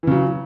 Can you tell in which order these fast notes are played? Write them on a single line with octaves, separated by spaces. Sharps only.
E3 C#3 F#3